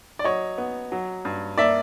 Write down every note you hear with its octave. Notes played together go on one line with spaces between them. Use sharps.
D5
F#3 C#5 D#5
B3
F#3
G2
A#3 D5 E5